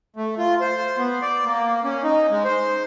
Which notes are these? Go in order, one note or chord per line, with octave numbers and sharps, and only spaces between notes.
A3
F4
C5
B3
D5
A#3
C#4
D#4
G#3
C5